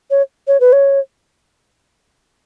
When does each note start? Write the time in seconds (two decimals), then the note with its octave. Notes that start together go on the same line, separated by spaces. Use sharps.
0.11 C#5
0.47 C#5
0.60 B4
0.73 C#5